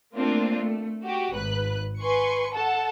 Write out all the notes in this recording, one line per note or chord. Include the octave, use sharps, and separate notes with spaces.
A3 A#3 C4 D4 F4
A3
F#4 G4
G#1 B4 F#6
B4 G#5 C6 C#6 C#7
A4 F#5 A5